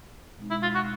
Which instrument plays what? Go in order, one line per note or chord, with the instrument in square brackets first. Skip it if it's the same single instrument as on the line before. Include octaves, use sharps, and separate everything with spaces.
[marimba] B2 G#3 C4 D#4
[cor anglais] E4
F4
F#4